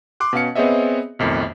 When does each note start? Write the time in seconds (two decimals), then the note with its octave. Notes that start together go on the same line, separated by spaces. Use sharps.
0.20 C6 D6 F#6
0.33 B2 C#4 F5 C#7
0.55 B3 C4 G#4 C#5 D#5 E5
1.19 B1 F2 A2 D#3